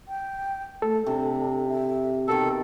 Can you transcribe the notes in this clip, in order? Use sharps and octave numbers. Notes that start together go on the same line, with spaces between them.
G5
A3 A4
C3 D4
E5
B2 D#3 A4 A#4